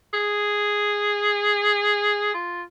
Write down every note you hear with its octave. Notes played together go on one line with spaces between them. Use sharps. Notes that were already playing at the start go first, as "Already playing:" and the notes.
G#4
F4